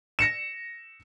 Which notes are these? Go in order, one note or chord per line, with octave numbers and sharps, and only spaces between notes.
A#6 C#7 E7